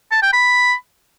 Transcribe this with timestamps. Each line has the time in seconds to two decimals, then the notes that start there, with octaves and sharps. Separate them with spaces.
0.12 A5
0.22 G5
0.33 B5